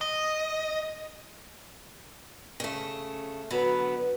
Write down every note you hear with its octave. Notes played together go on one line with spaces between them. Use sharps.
D#5
C#3 A3
D3 F#3 B3 B4